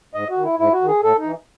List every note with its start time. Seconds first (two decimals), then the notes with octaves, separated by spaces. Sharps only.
0.14 G#2 D#5
0.30 F#4
0.37 D#3
0.45 E4
0.59 G#2 E4
0.73 F#4
0.81 D#3
0.88 G#4
1.03 A2 A4
1.18 D#4
1.25 E3